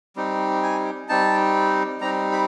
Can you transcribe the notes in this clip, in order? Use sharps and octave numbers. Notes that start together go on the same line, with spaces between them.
G3 C4 D#4
G#5
G3 C4 D#4 A5
G3 C4 D#4 A#5
B5